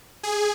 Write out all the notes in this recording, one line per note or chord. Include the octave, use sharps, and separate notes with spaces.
G#4